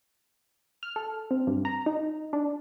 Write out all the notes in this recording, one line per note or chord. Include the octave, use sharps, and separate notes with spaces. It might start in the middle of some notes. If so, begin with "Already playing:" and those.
F6
A4
C4
G2
A#5
D#4
D4